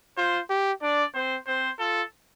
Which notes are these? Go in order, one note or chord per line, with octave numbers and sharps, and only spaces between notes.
F4 C5
G4
D4 D5
C4 C5
C4 C5
F4 A4